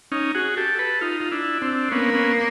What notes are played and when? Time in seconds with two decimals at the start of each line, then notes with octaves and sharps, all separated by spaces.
0.12 C#4 D#4
0.35 F#4 G#4
0.57 G4 A4
0.79 A4 B4
1.01 D#4 F4
1.21 F4
1.31 D4 E4
1.62 C4 D4
1.91 A#3 B3 C#4
2.14 B3 C#4